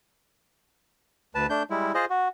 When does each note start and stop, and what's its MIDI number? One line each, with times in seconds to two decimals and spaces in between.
1.35 1.46 38
1.35 1.46 71
1.35 1.46 81
1.50 1.63 57
1.50 1.63 62
1.50 1.63 91
1.70 1.92 55
1.70 1.92 56
1.70 1.92 64
1.94 2.05 65
1.94 2.05 68
1.94 2.05 72
1.94 2.05 75
2.10 2.28 66